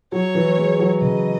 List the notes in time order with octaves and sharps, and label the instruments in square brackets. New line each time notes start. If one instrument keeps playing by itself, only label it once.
[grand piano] F#3 [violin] C#5
[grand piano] E3
G#3
F#3
[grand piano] C#3 [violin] D#5